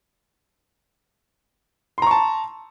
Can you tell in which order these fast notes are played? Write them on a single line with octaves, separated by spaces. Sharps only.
C6 A#5 C#6 A5